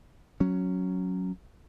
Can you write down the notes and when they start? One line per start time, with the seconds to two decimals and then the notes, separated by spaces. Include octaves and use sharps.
0.40 F#3 C#4